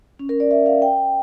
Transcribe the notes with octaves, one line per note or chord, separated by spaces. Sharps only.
C#4
A#4
D5
E5
F5
G5